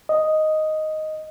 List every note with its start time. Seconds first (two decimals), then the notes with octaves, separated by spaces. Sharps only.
0.09 D#5